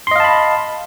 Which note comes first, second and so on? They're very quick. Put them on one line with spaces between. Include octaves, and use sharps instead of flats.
C6 D#5 F5 A5 B5